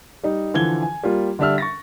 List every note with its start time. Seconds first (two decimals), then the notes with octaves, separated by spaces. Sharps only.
0.23 G3 D#4
0.54 D3 E3 F3 G#6 G7
0.82 G#5
1.03 G3 A#3 F4
1.39 D3 G3 D4 E5 E6 F6
1.58 C#6 A6 A#6